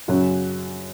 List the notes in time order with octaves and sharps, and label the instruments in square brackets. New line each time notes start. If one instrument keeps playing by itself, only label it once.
[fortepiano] F#2 C#3 F#3 C#4 F#4